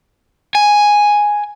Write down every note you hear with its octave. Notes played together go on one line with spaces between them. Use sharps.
G#5